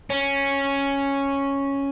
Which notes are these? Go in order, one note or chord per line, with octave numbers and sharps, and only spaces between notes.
C#4